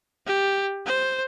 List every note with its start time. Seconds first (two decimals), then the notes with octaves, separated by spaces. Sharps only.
0.26 G4
0.86 C5